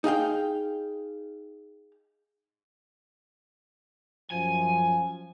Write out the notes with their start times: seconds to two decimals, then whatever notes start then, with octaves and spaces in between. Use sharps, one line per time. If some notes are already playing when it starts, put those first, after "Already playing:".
0.04 D#4 G#4 F5 G5
4.31 F#2 F3 G#5